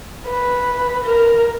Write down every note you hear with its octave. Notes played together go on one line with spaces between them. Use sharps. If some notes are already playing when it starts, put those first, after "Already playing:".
B4
A#4